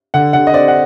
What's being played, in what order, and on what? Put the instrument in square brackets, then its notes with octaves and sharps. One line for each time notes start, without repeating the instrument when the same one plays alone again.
[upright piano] D3 F#5
D3 F#5
D#5
C4 D5
F#5